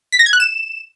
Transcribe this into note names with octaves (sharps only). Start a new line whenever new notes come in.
B6
A#6
G#6
F#6
E7